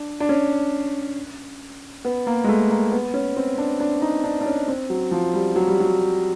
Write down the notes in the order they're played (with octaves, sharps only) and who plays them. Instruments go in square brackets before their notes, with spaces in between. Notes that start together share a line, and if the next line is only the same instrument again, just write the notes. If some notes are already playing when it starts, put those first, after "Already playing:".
Already playing: [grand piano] D4
D4
C#4
B3
A#3
G#3
A3
A#3
B3
C#4
C4
D4
D4
D#4
D4
D4
C#4
C4
F#3
F3
G3
F#3
G3
F#3